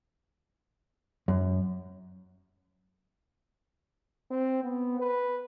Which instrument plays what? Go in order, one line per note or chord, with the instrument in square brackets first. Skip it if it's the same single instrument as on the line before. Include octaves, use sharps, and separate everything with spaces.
[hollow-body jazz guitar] F#2
[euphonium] C4
B3
B4